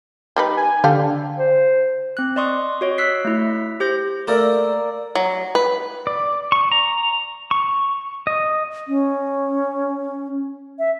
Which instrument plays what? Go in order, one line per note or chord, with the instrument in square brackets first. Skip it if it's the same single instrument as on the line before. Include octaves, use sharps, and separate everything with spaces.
[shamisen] G3 D#4 B4
[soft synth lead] G#5
[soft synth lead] D3 [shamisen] G4 A4 F5
[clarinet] C5
[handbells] C4 F#6
D5 D#5 C6 C#6 D#6
F#4 C#5 D#5
E6 F#6 B6 C7
A3 E4
G4 C5 G6 A#6
[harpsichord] A3 A#4 [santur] A#3 D5 E6
[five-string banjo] F#3
B4
[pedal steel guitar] D5
C#6
A#5
C#6
D#5
[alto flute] C#4
E5